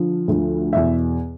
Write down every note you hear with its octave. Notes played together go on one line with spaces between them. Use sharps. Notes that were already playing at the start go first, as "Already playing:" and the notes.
Already playing: D3 F3
D2 D3 F3
E2 B2 E5